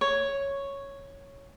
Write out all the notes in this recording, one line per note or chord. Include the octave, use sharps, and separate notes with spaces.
C#5